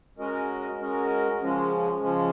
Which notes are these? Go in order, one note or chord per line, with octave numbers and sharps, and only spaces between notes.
G#3 C#4 F#4 A#4 D#5
G#3 C#4 F#4 A#4 D#5
C#3 F3 G#3 C#4
C#3 F3 G#3 C#4